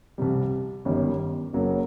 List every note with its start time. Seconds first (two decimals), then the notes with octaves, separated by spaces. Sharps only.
0.18 C2 C3 G3
0.85 G1 F#2 D#3 G3
1.54 F#1 F#2 F#3 A#3